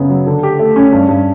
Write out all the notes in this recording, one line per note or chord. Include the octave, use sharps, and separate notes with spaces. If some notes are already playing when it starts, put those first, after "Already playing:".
Already playing: F#2 C#3 B3
F#3
D3
G4
A3
C#4
G2
G2